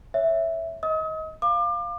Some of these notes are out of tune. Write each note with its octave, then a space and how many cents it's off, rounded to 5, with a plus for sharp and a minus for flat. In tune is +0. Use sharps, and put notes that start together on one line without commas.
C#5 +0 E5 +0
D#5 +20 D#6 +40
F5 +0 D6 +30